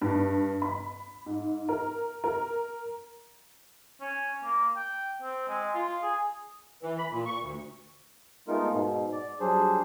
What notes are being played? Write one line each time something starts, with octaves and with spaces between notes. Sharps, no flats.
G2
B5
G#2
A#4
A#4
C#4
A#3
G5
C4
G#3
F4
G#4
E3
B5
A#2
C#6
D2
G#3 A3 B3 D#4 F4 A#4
G#2 B2
D5
F#3 G3 D4 G#4 C5